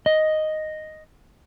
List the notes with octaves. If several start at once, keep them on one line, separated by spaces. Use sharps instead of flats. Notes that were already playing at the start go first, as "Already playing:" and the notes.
D#5